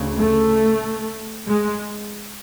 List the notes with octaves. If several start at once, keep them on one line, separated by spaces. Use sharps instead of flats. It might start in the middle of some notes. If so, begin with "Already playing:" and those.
Already playing: D2 C#3
A3
G#3